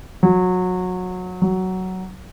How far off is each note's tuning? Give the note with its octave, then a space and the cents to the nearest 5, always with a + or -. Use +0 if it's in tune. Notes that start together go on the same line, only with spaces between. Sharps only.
F#3 -20
F#3 +10